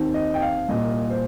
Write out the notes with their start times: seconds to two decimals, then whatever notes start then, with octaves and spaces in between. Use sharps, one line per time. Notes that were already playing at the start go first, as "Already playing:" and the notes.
Already playing: D#2 D#3 C4
0.14 D#5
0.34 G5
0.42 F5
0.69 C2 A#2 A#3 D#5
1.10 C5